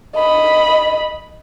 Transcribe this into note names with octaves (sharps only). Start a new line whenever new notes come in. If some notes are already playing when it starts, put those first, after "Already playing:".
D#5 B5